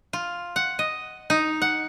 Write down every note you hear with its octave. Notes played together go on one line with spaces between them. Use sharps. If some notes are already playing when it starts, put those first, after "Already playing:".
F4
F#5
D#5
D#4
F#5